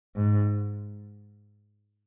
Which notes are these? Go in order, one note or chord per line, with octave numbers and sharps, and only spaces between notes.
G#2